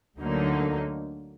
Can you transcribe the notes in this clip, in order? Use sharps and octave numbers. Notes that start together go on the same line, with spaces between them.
D2 D3 F#3 A#3 D#4